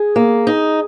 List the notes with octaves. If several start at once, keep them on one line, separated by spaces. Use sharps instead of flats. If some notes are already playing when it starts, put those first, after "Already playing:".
Already playing: G#4
A#3
D#4